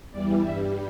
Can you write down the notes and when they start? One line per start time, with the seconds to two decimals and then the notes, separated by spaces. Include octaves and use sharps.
0.11 E2 E3 G3 D5
0.41 G2 E5
0.45 G3